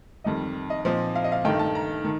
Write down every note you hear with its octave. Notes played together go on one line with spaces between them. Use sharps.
F2 D#3 G3 D#5
D#5
A#2 F3 C4 D#4
F5
D#5
F5
G2 D#3 A3 D#4 G5
A5
A#5
D#3